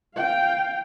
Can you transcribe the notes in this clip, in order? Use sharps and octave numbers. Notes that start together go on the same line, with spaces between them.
F5 G5